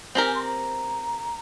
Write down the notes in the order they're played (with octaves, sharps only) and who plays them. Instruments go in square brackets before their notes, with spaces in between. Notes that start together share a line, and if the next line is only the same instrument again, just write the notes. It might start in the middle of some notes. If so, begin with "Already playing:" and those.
[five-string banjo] C4 G4 A#4 [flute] G#5
[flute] G#5
C6
A#5